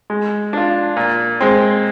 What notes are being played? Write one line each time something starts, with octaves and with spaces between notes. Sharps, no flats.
G#3
D4 F4
A#2
G#3 C4